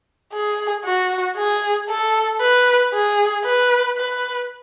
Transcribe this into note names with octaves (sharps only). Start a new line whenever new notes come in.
G#4
F#4
G#4
A4
B4
G#4
B4
B4